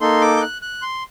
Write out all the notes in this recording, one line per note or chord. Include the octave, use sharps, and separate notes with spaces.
A#3 D#4 A4 C6
D6
G6
F#6
F#6
C6